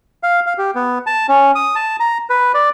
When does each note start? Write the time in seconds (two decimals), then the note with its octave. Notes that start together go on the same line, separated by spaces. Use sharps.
0.23 F5
0.46 F5
0.58 G4
0.75 B3
1.07 A5
1.29 C#4
1.55 D#6
1.76 A5
2.00 A#5
2.30 B4
2.54 D5